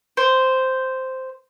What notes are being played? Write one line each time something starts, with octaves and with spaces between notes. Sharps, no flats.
C5